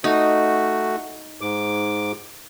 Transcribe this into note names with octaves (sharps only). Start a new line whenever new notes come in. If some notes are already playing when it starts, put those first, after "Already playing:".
A3 D#4 F#4
G#2 D6